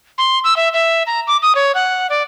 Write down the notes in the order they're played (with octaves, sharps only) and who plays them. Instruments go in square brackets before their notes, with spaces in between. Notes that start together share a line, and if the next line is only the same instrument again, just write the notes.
[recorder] C6
E6
E5
E5
A#5
D6
D#6
C#5
F#5
D5